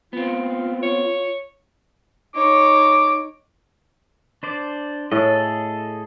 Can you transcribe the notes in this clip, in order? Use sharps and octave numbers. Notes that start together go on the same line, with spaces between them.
B3 C4 F4
C#5
D#4 C#5 D6
D4 C5 D5
A2 G#4 A4 D#5